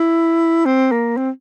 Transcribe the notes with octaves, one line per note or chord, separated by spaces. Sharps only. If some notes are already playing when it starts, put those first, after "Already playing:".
Already playing: E4
C4
A#3
C4